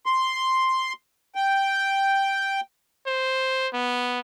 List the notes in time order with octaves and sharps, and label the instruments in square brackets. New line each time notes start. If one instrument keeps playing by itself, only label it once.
[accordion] C6
G5
[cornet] C5
B3